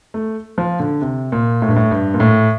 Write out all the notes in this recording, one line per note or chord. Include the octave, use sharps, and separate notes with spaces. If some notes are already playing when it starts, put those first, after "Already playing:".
A3
F3
D3
C3
A#2
A2
G2
A2
G2
A#2
A2